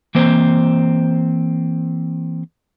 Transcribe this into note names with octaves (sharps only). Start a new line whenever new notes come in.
E3 A#3 C4 C5